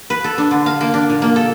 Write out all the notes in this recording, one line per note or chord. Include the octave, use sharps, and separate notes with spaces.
B4
A4
D4
D3
F5
A#3
D4
A#2
A#3
A4